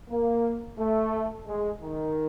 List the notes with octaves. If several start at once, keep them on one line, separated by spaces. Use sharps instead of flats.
A#3
A3
G#3
D#3